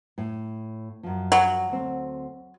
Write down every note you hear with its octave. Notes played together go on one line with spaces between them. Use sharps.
A2
F#2 F3
F#3
D2 C4